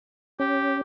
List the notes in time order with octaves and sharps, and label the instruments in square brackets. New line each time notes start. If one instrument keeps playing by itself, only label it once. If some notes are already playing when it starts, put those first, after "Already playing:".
[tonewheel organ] C#4 [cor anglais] G4